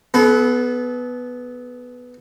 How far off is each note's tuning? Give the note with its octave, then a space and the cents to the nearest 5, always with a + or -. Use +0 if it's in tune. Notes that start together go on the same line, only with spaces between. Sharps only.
B3 +0 A4 -40